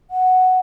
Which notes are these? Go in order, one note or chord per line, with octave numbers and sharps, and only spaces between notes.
F#5